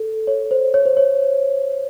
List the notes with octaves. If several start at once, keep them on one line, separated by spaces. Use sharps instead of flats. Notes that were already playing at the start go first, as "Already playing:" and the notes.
Already playing: A4
C#5
C5
C#5
C5
C#5